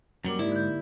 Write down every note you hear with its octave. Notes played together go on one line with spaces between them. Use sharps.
F#2 F#3 G3 A#3 A#4 D6
G#2 D#4 E4 G4 D5
D3 G6